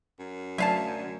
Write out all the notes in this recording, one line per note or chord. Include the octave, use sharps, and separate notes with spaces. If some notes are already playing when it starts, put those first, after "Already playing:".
F#2
D2 F#3 E5 F5 A5 G#6 D#7